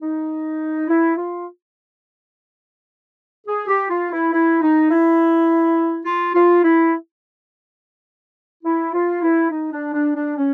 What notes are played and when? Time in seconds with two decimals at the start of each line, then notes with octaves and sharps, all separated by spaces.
0.01 D#4
0.87 E4
1.16 F4
3.46 G#4
3.67 G4
3.89 F4
4.11 E4
4.32 E4
4.61 D#4
4.90 E4
6.05 F4
6.34 F4
6.63 E4
8.64 E4
8.93 F4
9.21 E4
9.50 D#4
9.72 D4
9.94 D4
10.15 D4
10.37 C#4